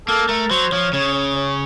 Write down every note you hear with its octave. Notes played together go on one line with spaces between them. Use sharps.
A#3 A4
A3 A#4
F#3 C5
F3 C#5
C#3 C#5
C#5
C#5